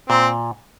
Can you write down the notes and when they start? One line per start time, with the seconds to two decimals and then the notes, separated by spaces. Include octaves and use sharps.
0.09 A#2 C4